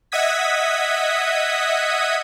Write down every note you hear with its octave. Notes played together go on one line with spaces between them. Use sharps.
D#5 E5 F#5 D#6 G#6 B6